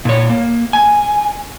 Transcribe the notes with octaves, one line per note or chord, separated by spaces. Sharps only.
A#2 C#5
A#3
G#5